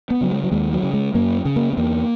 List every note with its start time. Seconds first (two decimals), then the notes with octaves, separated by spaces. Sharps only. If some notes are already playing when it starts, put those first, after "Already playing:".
0.10 B3
0.21 C#3 F#3
0.31 G#3
0.44 F#3
0.52 D#2 G#3
0.73 F#3
0.83 C#3
0.93 G#3
1.14 F#2 A#3
1.45 C#3
1.56 A#3
1.73 B3
1.77 E2 A#3